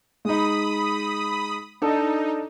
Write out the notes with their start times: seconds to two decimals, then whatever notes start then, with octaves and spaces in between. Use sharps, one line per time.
0.25 G#3 D#4 B5 D#6
1.82 D4 D#4 A4